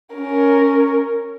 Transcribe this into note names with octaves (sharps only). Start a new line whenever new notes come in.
C#4 A#4